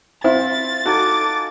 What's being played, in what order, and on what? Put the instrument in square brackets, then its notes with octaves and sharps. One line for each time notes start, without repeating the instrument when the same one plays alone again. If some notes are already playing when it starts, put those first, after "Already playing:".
[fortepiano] C4 E4 [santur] F4 [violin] A6
[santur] D#4 A4 G#5 [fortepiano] F#4 [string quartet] D6